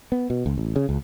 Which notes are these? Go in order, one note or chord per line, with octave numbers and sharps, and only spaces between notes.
B3
B2
C#2
A1
C#3
C#2